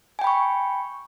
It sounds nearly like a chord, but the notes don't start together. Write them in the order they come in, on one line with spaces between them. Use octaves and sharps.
G#5 G5 B5 C#6